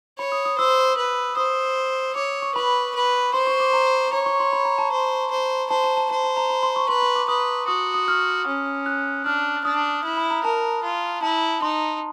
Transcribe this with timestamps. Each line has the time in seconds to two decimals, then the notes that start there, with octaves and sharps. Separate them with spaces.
0.18 C#5 B5
0.32 D#6
0.45 D#6
0.58 C5 E6
0.97 B4
1.37 C5 D#6
2.16 C#5 D6
2.42 C#6
2.55 B4 B5
2.95 B4
3.34 C5 C6
3.47 C#6
3.60 D6
3.73 A#5
4.12 C#5 A#5
4.26 C#6
4.40 C6
4.53 B5
4.65 A#5
4.78 A5
4.92 C5
5.31 C5
5.70 C5 A5
5.84 A5
5.97 A5
6.11 C5 A5
6.24 A5
6.37 A#5
6.50 B5
6.63 C6
6.76 C#6
6.89 B4 C6
7.02 C6
7.16 D6
7.28 B4 D#6
7.68 F#4 D#6
7.94 D#6
8.08 F6
8.47 C#4
8.86 F#6
9.26 D4 F6
9.65 D4 D#6
10.04 E4
10.17 B5
10.31 A#5
10.44 A#4 A5
10.84 F4
11.23 E4 A5
11.62 D#4 C6